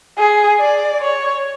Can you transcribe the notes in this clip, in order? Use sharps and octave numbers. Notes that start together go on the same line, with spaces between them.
G#4
D5
C#5